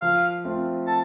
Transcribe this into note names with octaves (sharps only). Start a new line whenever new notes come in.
F3 F5
A3 C4 F4
A5